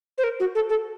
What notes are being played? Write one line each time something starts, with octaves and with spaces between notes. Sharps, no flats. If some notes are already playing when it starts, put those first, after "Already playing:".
C5
A#4
F#4
A4
A4